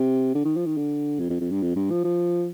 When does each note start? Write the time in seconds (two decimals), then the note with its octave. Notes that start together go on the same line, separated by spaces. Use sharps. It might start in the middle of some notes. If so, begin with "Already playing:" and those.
Already playing: C3
0.35 D3
0.45 D#3
0.56 F3
0.66 D#3
0.77 D3
1.20 F2
1.30 F2
1.41 F2
1.51 G2
1.62 F2
1.76 G2
1.90 F3
2.04 F3